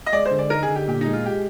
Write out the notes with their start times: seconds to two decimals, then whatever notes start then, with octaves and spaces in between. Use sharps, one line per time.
0.06 D#5
0.12 G#3 D5
0.25 C5
0.31 D3
0.39 D5
0.50 D#4 A#4
0.63 G#4
0.69 D3
0.75 G4
0.88 A#2 G4
1.01 D#4
1.06 G#3
1.13 F4
1.26 G4